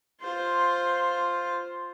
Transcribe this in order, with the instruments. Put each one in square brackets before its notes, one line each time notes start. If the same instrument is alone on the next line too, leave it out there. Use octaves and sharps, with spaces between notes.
[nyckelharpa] F4 C5